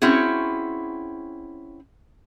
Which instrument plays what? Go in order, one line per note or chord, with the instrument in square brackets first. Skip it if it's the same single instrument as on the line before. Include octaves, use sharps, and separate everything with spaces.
[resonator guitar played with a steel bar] C4 C#4 E4 F#4 G#4